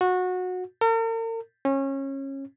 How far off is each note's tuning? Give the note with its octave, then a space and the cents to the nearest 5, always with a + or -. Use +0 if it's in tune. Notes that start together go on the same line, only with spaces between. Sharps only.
F#4 -20
A#4 -45
C#4 -25